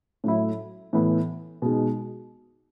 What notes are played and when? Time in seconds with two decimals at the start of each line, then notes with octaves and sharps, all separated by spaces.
0.24 A2 F#3 A3 E4
0.93 A2 E3 B3 E4
1.62 B2 G#3 D#4